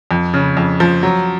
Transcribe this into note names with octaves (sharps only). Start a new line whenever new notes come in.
F2
C#3
F2
F3
F#3